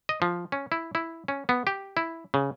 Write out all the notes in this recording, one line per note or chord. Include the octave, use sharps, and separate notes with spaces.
D#5
F3
C#4
E4
E4
C#4
B3
G4
E4
C#3